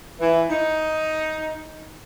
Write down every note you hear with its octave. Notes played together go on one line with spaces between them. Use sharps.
E3
D#4